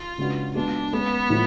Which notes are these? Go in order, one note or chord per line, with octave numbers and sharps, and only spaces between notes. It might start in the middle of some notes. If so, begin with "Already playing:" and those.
Already playing: F4
C#3 G#3 D4 F#4 B4
G#3 B3 D4 F#4 B4
G#3 B3 C#4 G#4 B4
A2 F3 G#3